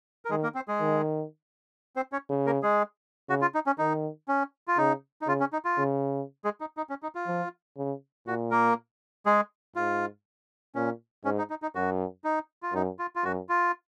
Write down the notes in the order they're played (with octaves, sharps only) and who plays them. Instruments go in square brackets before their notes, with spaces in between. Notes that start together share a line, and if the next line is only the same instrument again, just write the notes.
[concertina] A#4
[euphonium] D#3 [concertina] G#3 G#4
[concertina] A#3 A#4
C4 C5
G#3 G#4
[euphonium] D#3
[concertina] C4 C5
C#4 C#5
[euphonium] C#3
[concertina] A#3 A#4
G#3 G#4
[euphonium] C#3 [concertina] F#4
[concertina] F4
D#4
C#4
[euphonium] D#3 [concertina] D#4
[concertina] C#4
F4
[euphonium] C#3 [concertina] D#4
[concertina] D#4
[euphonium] C#3 [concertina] F4
[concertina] C#4
D#4
F4
[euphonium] C#3
[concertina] G#3 G#4
D#4
D#4
C#4
D#4
F4
[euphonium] F3
C#3
[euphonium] A#2 [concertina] F#4
[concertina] A#3 A#4
G#3 G#4
[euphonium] G#2 [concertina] F4
[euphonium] A#2 [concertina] C#4
[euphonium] G#2 [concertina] C#4
[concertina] D#4
D#4
D#4
[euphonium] F#2 [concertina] F#4
[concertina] D#4
F4
[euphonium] F#2 [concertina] D#4
[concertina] F4
F4
[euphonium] F#2 [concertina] F#4
[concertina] F4